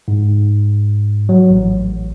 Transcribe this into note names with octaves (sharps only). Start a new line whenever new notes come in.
G#2
F#3
A1